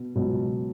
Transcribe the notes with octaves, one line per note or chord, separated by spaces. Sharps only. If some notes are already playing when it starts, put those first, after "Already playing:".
Already playing: B2
C#2 B2 F#3